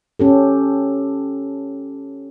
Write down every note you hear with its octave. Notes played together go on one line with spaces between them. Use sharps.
C#4 G4 A4